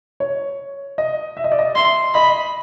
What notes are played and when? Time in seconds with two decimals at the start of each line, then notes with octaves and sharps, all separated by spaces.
0.20 C#5
0.98 D#5
1.37 E5
1.44 D#5
1.52 D5
1.59 D#5
1.75 E5 C6
2.14 D#5 B5